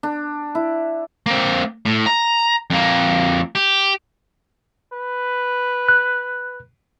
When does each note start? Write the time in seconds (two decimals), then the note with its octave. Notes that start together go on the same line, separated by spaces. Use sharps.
0.03 D4
0.55 E4
1.26 A#3 C4
1.85 A2
2.06 A#5
2.70 F2 A#3
3.55 G4
4.93 B4
5.88 F#6